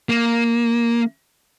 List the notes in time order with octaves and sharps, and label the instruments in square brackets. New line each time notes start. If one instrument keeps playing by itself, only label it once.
[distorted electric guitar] A#3